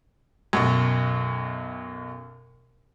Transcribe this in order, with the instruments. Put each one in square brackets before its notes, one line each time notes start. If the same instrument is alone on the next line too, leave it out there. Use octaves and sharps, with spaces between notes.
[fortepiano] B1 F#2